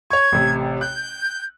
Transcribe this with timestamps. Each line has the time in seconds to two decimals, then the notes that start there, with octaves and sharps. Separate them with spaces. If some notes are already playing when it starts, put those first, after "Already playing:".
0.10 C#5 C#6 G#6
0.32 A1 C3
0.81 F#6 G6